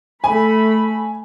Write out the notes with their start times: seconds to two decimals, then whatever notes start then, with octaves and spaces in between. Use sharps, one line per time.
0.24 A3 G#5 B5